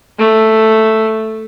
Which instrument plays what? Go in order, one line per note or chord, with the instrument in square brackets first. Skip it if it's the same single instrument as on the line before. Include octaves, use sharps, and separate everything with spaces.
[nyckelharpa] A3